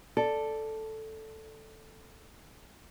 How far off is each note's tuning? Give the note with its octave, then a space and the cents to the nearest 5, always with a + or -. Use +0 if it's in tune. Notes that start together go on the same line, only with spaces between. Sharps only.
A4 +0 D5 +0